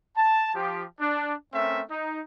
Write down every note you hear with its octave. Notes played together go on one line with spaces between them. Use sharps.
A5
F3 G4
D4
A3 C4 C#4 A#4 E5
D#4